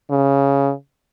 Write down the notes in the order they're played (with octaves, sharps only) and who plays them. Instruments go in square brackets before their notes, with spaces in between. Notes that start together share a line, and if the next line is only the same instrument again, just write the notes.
[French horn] C#3